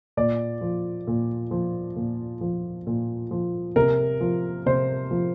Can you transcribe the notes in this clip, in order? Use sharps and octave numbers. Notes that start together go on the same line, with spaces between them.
A#2 D5
F3
A#2
F3
A#2
F3
A#2
F3
C3 A#4
F3
C3 C5
F3